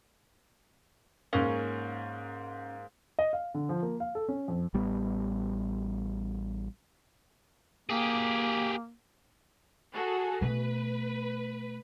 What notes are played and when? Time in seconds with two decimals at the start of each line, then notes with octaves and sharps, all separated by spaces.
1.33 G#2 A#3 C#4
3.19 D#5
3.33 F5
3.54 D3
3.69 F3
3.83 A#3
4.00 F5
4.15 A4
4.28 C#4
4.48 F2
4.74 A1 G3 B3
7.90 A#3 G4 G#4
9.94 F#4 G#4 A4
10.41 B2 A3 B4